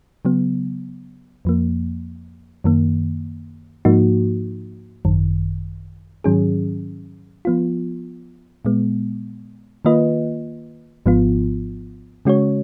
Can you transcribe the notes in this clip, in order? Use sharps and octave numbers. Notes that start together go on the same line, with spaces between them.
C#3 F#3 B3
F2 F3 A#3
F#2 D#3 A#3
G#2 F3 A#3 D#4 F#4
G#1 F#2 D#3
G#2 D#3 F#3 C#4 G#4
F3 B3 F4
A#2 G#3 B3
D#3 A#3 F4 B4 D#5
G#1 G#2 F3 B3 F4
C#3 G#3 C#4 F#4 C#5